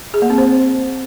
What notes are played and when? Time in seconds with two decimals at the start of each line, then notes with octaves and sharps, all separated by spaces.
0.14 G#4
0.22 A#3
0.30 C4
0.38 C5